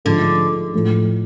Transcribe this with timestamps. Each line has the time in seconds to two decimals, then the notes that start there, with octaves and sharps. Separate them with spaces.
0.05 G#2 D3 F3 A3 D4
0.74 A2 F3 A3